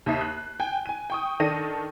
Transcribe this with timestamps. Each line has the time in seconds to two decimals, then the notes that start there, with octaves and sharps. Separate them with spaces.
0.06 D#2 D#4 E5 C7
0.21 F#6
0.60 G5 G#5
0.86 G#5 D#7
1.10 G5 C#6 D#6
1.40 D#3 D4 A4 A#6 D#7